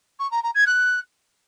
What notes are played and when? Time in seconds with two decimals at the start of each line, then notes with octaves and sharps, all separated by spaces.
0.19 C#6
0.31 A#5
0.43 A#5
0.55 G#6
0.66 F#6